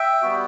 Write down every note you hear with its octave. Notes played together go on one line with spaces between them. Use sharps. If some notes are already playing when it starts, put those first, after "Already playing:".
Already playing: E5 G5
G3 B3 F#4